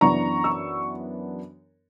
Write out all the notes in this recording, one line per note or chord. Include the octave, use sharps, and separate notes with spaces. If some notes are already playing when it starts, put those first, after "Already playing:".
F#2 E3 B3 D4 A#5 C#6
C#6 E6